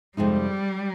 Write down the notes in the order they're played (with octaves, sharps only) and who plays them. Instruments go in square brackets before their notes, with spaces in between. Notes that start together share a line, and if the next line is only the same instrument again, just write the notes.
[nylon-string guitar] F2 C3 F3 G#3 D#4 [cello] G3